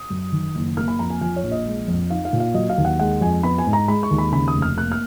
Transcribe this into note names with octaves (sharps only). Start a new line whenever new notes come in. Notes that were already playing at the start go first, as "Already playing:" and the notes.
Already playing: D#6
F#2
D#3
F#1
A#3 F6
B5
F2 A#5
G#5
F3 G#5
C#5
A#1
D#5
G#3
F2
D#4 F5
F5
A#2
F5
F#3 D#5
F5
D#2
F#5
G#3 F#5
F2 G#5
B3 B5
G#5
G#2
A#5
G#3 B5
C#6
D#2
B5
C#3 B5
D#6
F1
F6
A#3 F#6
F6